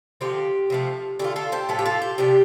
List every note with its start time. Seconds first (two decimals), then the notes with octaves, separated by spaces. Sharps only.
0.21 D3 F3 C4 G4
0.70 C3 F3 A3
1.19 D3 A3 F4 G4
1.36 F4 A4
1.52 G4 C5
1.69 A2 F3 A3 F4 A4
1.79 G4
1.85 F4 A4
2.02 G4
2.18 C3 F3 D4 G4